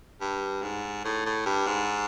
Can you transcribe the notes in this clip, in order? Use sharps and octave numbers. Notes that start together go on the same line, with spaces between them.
G2
G#2
A2
A2
G2
G#2